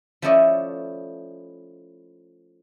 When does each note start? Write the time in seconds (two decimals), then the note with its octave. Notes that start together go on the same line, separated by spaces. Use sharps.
0.22 F3 A3 C#4 E4 D5 D#5